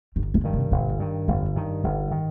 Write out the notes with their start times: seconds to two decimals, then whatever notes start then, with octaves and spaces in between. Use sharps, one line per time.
0.16 G1 D#3
0.34 D3
0.44 G2 D#3
0.53 C3
0.72 G1 A#2
0.99 G2 D#3
1.28 G1 F2
1.56 G2 D#3
1.84 G1 G2
2.11 D#3